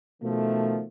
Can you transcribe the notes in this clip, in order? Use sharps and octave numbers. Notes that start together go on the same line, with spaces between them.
B2 D#3 F3 A3